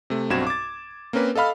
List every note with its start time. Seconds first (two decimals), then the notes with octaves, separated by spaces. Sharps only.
0.10 C3 A3
0.30 B1 G2 C4 F#4 G#6 E7
0.47 D6 A6
1.13 A#3 C4 C#4 A#4 B4
1.35 A4 D#5 F5 B5 F6